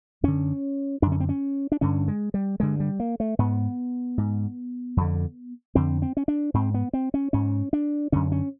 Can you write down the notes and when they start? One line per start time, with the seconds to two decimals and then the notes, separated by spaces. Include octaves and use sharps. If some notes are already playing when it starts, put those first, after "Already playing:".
0.23 F#2 D3 C#4
1.02 F#2 D4
1.07 D3
1.12 C#4
1.20 C4
1.29 C#4
1.72 D4
1.81 G2 D3 C#4
2.08 G#3
2.34 G3
2.60 G2 D3 G#3
2.80 G3
3.00 A#3
3.20 A3
3.39 G#2 B3
4.18 G#2
4.97 F2 D3
5.75 F2 D3 C4
6.02 C4
6.17 C#4
6.28 D4
6.54 G#2 C4
6.74 B3
6.93 C4
7.14 C#4
7.33 G#2 C#4
7.73 D4
8.12 F#2 D3 C#4
8.32 C#4